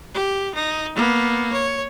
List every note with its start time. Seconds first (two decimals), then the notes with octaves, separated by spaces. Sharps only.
0.14 G4
0.55 D#4
0.96 A#3 B3
1.52 C#5